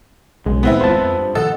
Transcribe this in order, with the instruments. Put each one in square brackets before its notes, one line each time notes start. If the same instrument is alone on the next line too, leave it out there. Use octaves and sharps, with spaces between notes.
[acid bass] B1 [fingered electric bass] C#3 [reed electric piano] G#3
[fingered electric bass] A2 D#3 [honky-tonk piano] B3 C4 E4
[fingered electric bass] F#1 D#2 G#3 [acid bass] F4 [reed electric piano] C5 A5
[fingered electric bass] F2
G2
[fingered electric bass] A#2 D#3 F3 [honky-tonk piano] A4 [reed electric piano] D#5 F#5